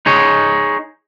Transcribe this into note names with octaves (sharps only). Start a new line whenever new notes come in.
D#4 G#4 C#5